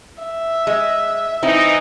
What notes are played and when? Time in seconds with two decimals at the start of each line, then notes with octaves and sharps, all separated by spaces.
0.22 E5
0.67 G#3
1.43 E3 C4 D#4 E4